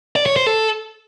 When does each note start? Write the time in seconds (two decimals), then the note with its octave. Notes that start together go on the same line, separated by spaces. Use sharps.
0.16 D5
0.26 C#5
0.36 C5
0.47 A4